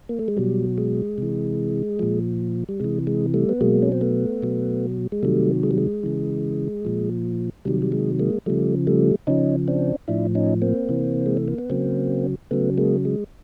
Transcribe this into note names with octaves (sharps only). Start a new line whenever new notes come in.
A#3
A3
G#3
B2 F#3 G3
G#3
C3 E3
A#2 F3
G3
C3 E3 G#3
G#3
G3 A3
B3
B2 F#3 G#3 A#3
C#4
C4
A3 B3
B2 F#3
G#3
C3 D#3 F#3 G3 A3
G#3
G3
G#3
C#3 E3
A#2 F3
C3 D#3 F#3 G3
G3
G#3
G#3 A#3
C#3 F3 G3 A3
G3 A3
C#3 F3 C#4 D#4
C4 D4
A2 F3 D4 E4
C#4 D#4
A#3 C4
C3 E3
G#3
A3
A#3
B3
C#3 F#3 A#3 C4
C#3 F#3 A3 B3
G#3 A#3
G#3